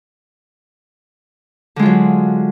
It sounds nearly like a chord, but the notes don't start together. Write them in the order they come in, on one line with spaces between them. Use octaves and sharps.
D3 G#3 F4 F#3